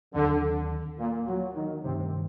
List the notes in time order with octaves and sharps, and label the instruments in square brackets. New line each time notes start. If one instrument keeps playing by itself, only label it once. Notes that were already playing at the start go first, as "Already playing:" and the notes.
[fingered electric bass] D#2 D#3 F#3 C4 [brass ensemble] D3
[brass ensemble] A#2
F#3
D#3
[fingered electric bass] G2 D#3 A3 D4 [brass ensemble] C3